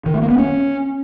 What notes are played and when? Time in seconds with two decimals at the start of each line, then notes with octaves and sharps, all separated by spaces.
0.06 D#3
0.14 A3
0.22 A#3
0.30 B3
0.38 C#4